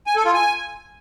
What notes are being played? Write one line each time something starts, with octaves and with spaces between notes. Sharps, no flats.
G#5
A4
F4
G#5